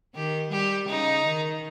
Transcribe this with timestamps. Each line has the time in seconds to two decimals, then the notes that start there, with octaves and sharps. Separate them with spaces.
0.15 D#3 G4
0.52 G3 G4
0.88 C#3 D#4
1.25 D#3